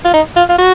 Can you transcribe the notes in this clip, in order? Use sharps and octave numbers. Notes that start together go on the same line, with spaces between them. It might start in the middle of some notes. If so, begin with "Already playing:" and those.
F4
D#4
F4
F4
F#4